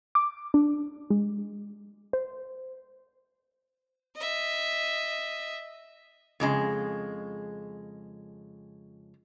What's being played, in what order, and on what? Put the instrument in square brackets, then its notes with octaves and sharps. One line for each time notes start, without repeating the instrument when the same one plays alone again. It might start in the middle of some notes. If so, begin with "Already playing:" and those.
[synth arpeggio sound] D6
D4
G#3
C5
[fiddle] D#5 E5
[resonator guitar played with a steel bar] F2 C#3 G#3